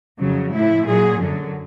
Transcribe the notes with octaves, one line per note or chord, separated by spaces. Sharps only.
F2 C#3 F#3
A2 F3 E4
A#2 F#3 G#4
F#2 D3 F#3